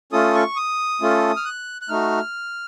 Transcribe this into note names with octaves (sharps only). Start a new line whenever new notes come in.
A3 C#4 F4 A4 D#6
C#6
D#6
A3 C#4 F4 A4
F6
F#6
F#6
A3 D#4 F#4 F6